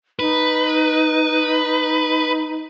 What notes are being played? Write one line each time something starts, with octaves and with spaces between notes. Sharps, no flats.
D#4 B4